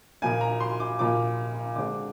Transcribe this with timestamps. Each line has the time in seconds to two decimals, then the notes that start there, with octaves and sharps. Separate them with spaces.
0.22 A#2 F3 A#3 G#5
0.41 A#5
0.60 C6
0.80 D6
0.99 A#2 F3 A#3 D6
1.76 D3 G#3 C4 D6